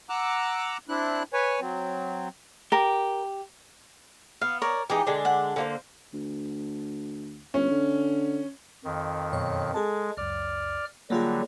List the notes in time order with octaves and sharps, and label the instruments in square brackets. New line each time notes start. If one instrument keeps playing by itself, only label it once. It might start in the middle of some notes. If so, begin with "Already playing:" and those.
[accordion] F#5 A#5 D6 E6 F#6
C4 D4 E4 F#6
B4 C#5 G#5
F#3 C4
[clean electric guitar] G4 [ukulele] A#4
[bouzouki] B3 [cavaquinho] F5
[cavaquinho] A#4 C#5 D5
[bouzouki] E3 G#3 D#4 [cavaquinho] G4
[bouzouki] D3 G#3 D4
[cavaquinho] F#5
[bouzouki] D3 A#3 C5
[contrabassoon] D2
[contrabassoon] G1 [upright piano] C#4
[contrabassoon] D3
[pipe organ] F2 D#3
[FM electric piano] F#2 B2 C#5
[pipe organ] G#3 [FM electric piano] G#4 A4 A5
[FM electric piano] C#2 F#2 [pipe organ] D5 F6
[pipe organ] D3 F#3 G3 [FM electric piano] A#3 F4 G#4